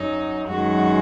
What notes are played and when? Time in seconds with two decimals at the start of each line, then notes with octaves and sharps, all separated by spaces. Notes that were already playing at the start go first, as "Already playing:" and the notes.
Already playing: F#2 F#3 D#4
0.49 F#2 D#3 G#3 F#4